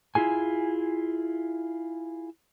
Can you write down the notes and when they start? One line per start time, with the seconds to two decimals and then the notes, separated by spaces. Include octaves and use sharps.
0.15 E4 F4 G#4 G#5